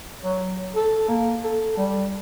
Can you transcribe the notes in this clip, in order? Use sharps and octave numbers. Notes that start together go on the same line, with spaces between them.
F#3
A4
A#3
A4
G3